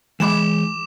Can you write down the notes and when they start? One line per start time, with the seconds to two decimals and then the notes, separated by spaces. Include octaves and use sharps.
0.20 E3 G#3 B5 D6 E7